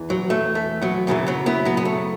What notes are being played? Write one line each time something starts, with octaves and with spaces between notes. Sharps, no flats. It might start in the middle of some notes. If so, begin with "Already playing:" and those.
Already playing: E2 E3
F#3
A3
A3
F#3 B3
F#2 C#3 E3 F#3 B3
F#3 B3
B3 E4
F#3 B3
B3
A3